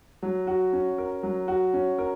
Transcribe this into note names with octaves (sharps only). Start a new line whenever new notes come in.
F#3
F#4
C#4
A#4
F#3
F#4
C#4
A#4